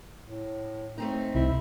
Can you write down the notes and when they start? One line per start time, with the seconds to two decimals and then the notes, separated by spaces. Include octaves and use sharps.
0.24 A2
0.98 A3 C4 D#4
1.35 C2 E4